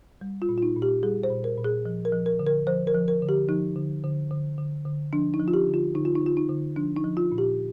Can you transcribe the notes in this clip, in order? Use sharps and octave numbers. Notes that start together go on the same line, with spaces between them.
G3
F4
A#2
F4
D#4
A#2
G4
G3 G#4
C5
A#2
A#4
A#2
G#4
F3
A#4
F3
A#4
D3
A#4
F3 C5
A#4
F3
A#4
D3
G4
F3 D#4
D3
D3
D3
D3
D3
F3 D4
D#4
F3
F4
G4
D3
F4
D3 D#4
F4
D#4
D3
F4
D#4
D3
F3 D4
D#4
F3
F4
A#2
G4